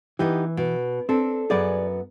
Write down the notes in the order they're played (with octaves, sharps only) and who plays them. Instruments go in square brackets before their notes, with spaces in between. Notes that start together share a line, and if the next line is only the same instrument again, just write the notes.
[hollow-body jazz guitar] E3 [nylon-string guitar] B3 D#4 G4
[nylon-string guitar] B2
[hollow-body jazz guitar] C4 [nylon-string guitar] D4 A4
[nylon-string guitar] F#2 B3 B4 [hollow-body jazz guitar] G#4 D5